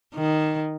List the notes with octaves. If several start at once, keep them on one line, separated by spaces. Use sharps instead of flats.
D#3